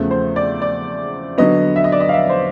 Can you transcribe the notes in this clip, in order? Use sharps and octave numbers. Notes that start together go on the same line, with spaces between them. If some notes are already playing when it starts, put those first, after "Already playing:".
Already playing: E2 C#3 F3 A3
C5
D5
D5
D3 F#3 B3 D#5
E5
D#5
D5
D#5
F5
E5
C5